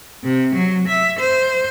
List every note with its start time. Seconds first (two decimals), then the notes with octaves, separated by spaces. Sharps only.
0.24 C3
0.55 F#3
0.88 E5
1.19 C5